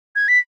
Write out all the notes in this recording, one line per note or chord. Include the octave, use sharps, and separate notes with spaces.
G#6
B6